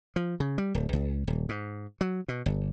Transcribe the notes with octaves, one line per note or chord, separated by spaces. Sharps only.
F3
C#3
G3
D1
C#2
D#1
G#2
F#3
B2
G1